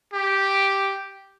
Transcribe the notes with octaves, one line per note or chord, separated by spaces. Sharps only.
G4